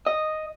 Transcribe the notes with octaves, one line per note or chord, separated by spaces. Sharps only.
D#5